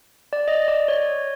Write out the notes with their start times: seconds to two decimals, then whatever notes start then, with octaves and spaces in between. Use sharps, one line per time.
0.33 D5
0.48 D#5
0.68 D5
0.88 C#5